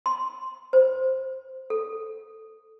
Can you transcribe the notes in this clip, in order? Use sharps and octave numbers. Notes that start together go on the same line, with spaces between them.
C6
C5
A4